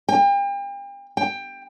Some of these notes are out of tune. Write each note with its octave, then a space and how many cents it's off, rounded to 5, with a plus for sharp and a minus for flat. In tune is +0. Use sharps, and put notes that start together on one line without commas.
G5 +40
G5 +20